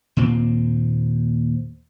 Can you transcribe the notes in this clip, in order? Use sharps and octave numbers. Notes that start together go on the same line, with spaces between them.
D#2 A#2 C4